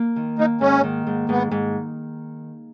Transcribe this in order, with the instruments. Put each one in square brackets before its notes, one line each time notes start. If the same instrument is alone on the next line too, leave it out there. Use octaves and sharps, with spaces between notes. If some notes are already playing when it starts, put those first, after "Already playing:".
Already playing: [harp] A#3
D#3
[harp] A#3 [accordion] D#4
[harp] G#2 [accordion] C#4
[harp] D#3
G#2
[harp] G#2 [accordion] B3
[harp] G#2